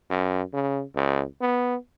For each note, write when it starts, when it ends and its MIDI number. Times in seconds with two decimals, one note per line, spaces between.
0.11 0.42 42
0.54 0.82 49
0.96 1.24 37
1.41 1.76 59